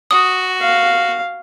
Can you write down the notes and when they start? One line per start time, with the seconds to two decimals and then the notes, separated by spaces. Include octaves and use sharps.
0.11 F#4 D#6
0.61 F5